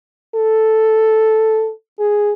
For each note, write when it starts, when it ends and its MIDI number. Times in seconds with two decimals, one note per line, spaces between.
0.35 1.71 69
1.99 2.33 68